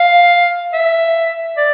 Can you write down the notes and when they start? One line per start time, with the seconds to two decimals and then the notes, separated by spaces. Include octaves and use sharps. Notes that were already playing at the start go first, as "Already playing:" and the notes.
Already playing: F5
0.73 E5
1.57 D5